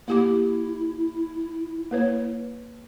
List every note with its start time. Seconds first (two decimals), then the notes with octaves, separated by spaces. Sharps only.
0.08 A#3 E4 G4 D6
1.91 A#3 B4 C#5